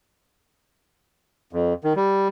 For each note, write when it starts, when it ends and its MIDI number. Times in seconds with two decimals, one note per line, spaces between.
1.53 1.73 41
1.84 1.93 51
1.96 2.28 55